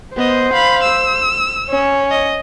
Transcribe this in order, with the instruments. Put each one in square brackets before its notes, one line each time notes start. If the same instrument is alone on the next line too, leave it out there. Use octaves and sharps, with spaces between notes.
[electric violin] B3 D#5 [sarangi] C5
[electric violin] F5 B5
E6
[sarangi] C#4
[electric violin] D#5